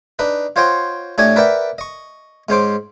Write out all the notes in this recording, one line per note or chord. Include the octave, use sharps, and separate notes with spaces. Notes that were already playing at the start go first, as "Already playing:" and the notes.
D4 D#4 B4
F4 C5 C#5 D#5 F#5 G5
A2 D4 G4 C#5 D#5 G#5
A#4 B4 D5 E5 F#5 G5
D#5 C#6
G#2 C#4 C5 D6